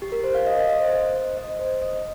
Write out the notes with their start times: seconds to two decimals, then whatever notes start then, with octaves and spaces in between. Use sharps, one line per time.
0.02 G4
0.12 A#4
0.24 C5
0.35 F5
0.46 D#5
0.58 D#5
0.69 D#5
0.80 C5
0.92 C5
1.37 D#5
1.59 C5
1.82 D#5